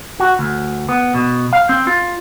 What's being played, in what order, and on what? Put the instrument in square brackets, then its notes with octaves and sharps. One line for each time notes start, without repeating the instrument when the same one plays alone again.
[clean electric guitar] F#4
D2
B3
B2
F5
C4
F4